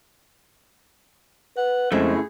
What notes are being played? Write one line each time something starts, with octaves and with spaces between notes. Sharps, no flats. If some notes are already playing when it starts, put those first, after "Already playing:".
B4 F#5
F2 A2 C#3 G#3 A3 C4 G#4 E5